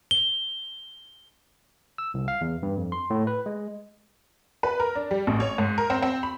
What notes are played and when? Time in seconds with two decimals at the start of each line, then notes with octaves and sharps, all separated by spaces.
0.11 G7
1.98 E6
2.14 C2
2.28 F5
2.41 E2
2.63 G2
2.77 F2
2.92 C6
3.10 A2
3.27 B4
3.46 G#3
4.63 B4
4.80 A#4
4.95 D4
5.11 G3
5.27 A1
5.40 C#5
5.58 G#2
5.78 A#4
5.90 C4
6.02 C4
6.23 B5